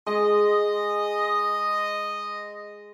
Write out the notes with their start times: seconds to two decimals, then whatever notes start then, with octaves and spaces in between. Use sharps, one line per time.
0.06 G#3 G#4 D#5